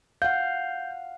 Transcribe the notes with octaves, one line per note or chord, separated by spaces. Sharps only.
F5 F#5 G6